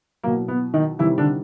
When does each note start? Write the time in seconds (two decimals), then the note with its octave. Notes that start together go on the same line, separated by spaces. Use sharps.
0.24 B2 F#3 A#3
0.48 B3
0.74 D#3 D#4
0.99 C3 D#3 E3 G3 E4
1.18 D3 D4